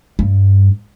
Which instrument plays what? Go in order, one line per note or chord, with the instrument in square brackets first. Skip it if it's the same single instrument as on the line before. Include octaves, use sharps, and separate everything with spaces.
[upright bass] G2